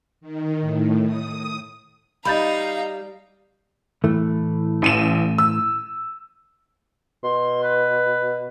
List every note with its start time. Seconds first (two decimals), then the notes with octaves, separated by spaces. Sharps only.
0.21 D#3
0.61 A2
1.06 D#6
2.25 G3 D#4 F5 A#5 B5 G6 A6
4.04 A2 E3 A3
4.82 A1 D#7 E7
5.38 E6
7.24 B2 C6
7.63 B4